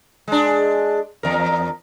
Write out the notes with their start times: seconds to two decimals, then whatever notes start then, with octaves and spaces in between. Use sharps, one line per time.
0.28 G#3 D4
1.23 E2 A#4